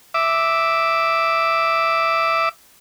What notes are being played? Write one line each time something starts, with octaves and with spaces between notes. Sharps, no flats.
E5 D6